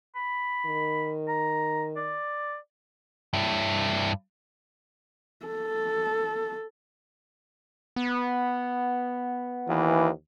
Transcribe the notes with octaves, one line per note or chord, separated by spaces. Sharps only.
B5
D#3
A#5
D5
G2 E4
A4
B3
D#2 E3